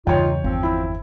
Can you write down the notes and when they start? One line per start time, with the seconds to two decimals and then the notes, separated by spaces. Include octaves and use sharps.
0.07 E2 G2 C#3 D#4 F4 C#5 G5
0.44 G1 F3 C4
0.63 E4